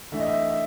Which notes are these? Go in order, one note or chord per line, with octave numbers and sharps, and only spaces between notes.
E3 A3 D4 E5
D#5
E5
E5